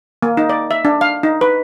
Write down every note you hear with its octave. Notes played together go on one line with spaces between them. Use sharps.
A#3
D#4
D5
E5
D4
F5
D#4
B4